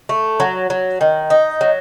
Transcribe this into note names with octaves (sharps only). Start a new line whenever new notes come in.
A3
F#3
F#3
D#3
D#4
F#3